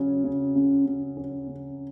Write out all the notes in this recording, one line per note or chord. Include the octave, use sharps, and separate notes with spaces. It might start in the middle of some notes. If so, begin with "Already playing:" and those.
Already playing: C#3 F#3 C#4
C#3
C#3
C#3
C#4
C#3